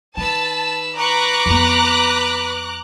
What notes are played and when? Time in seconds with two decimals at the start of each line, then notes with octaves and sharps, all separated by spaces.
0.17 D#3 B4 A5 E6
0.96 B4 A#5 C#6 D6 F#6
1.46 F2 B3
1.82 B4